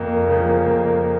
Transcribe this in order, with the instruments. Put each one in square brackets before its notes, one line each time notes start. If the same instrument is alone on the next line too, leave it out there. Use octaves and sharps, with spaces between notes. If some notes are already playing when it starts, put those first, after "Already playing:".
Already playing: [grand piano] F2 [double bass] A#3
[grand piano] C#3 F3
F2